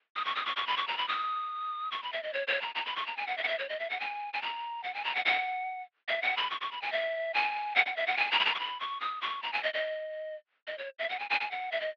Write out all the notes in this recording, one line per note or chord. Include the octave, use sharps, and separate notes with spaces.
D#6
C#6
D#6
C#6
C#6
B5
C#6
A#5
B5
D#6
C#6
B5
E5
D#5
C#5
C#5
A#5
A#5
B5
C#6
A#5
G#5
F#5
E5
F#5
E5
C#5
D#5
E5
F#5
G#5
G#5
A#5
F#5
G#5
A#5
F#5
F#5
E5
F#5
B5
C#6
C#6
B5
G#5
E5
G#5
F#5
F#5
E5
F#5
G#5
A#5
B5
A#5
C#6
B5
C#6
D#6
C#6
A#5
G#5
D#5
D#5
D#5
C#5
E5
F#5
G#5
G#5
G#5
F#5
E5
D#5